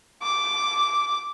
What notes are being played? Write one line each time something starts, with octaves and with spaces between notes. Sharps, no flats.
D6